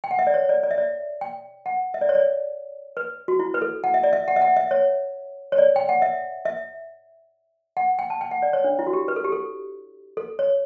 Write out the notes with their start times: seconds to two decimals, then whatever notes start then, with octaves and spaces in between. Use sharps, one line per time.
0.04 G5
0.11 F#5
0.19 E5
0.27 D5
0.34 C#5
0.49 D5
0.63 D5
0.71 E5
0.78 D5
1.21 G5
1.66 F#5
1.94 E5
2.01 D5
2.09 C#5
2.15 D5
2.97 B4
3.28 F#4
3.39 E4
3.54 B4
3.62 A4
3.84 F#5
3.94 E5
4.04 D5
4.13 E5
4.28 F#5
4.36 E5
4.42 F#5
4.56 E5
4.71 C#5
5.52 C#5
5.58 D5
5.76 G5
5.89 F#5
6.02 E5
6.45 E5
7.77 F#5
7.99 G5
8.10 A5
8.21 G5
8.31 F#5
8.42 D5
8.53 C#5
8.64 D4
8.79 E4
8.87 F#4
8.93 G4
9.08 B4
9.16 A4
9.24 G4
9.32 A4
10.17 A4
10.39 C#5